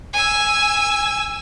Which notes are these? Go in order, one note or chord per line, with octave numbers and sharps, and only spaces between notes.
G#5 E6